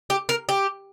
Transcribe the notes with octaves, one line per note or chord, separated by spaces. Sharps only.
G4
A#4
G4